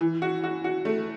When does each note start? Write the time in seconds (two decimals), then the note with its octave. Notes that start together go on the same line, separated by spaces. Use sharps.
0.01 E3
0.22 F#4
0.44 F#4
0.64 F#4
0.85 A3